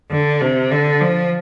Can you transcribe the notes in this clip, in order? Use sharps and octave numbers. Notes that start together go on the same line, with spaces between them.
D3
C3
D3
F3